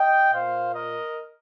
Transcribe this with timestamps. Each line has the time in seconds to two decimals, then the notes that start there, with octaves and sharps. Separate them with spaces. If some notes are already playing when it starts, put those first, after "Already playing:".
Already playing: D#5 G5
0.33 A#2 A#3 C5 F5
0.75 A#4 D#5